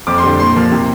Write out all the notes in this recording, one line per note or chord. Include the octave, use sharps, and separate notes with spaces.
F2 D6
C6
D3 G3
A#2 C6
F3 A#3
C3